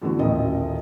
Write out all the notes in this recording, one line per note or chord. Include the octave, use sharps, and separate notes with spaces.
F#2 D3 E3 A3 B3 F#4
D#1 A1 A#4 D#5 E5